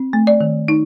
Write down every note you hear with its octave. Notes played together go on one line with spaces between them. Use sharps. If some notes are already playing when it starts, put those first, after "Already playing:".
Already playing: C4
A3
D5
D#3
D#4